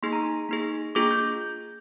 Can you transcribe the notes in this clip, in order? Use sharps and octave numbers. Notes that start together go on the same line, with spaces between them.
A#3 D#4 G#4 C6
A#5
C6
A#3 D#4 G#4
A#3 D4 F4 G#4 D6
G6